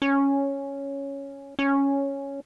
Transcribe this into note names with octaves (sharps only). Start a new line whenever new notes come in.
C#4
C#4